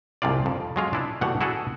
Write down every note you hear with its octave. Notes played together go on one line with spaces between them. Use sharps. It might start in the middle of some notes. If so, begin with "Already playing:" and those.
C2 G#2 C3 F4 D5
F2
F#3 G#3 F4
D4 E4 B4
B2 E3 G3 A3 F#5
E4 F#4 G#4 A4 F#5